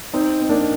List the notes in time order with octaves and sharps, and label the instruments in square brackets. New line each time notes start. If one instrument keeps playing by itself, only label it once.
[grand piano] C4 D#4
C4
A#3 D4